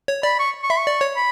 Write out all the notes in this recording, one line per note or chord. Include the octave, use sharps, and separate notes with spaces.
C#5
D5 B5
C#6
C#6
E5 B5
C#6
D5
C#5
B5